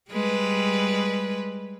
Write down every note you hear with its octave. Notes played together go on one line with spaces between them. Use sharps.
G3 G#3 B4